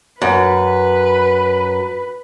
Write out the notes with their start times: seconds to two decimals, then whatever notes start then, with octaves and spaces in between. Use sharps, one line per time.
0.22 F#2 B4